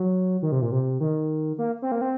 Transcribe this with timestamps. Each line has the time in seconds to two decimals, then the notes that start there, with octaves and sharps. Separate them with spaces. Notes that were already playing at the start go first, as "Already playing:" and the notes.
Already playing: F#3
0.42 D#3
0.52 C3
0.62 A#2
0.72 C3
1.00 D#3
1.58 A#3
1.82 C4
1.92 A#3
2.01 C4